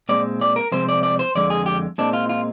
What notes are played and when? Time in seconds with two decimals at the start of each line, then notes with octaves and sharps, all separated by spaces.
0.09 A#2 G#3 C4 D5
0.41 D5
0.56 A#4
0.72 C3 F3 G#3 C4 C5
0.89 D5
1.03 D5
1.19 C5
1.35 F2 D3 G#3 D5
1.50 G#4
1.66 G4
1.98 A#2 G#3 C4 D4
2.13 F4
2.29 F4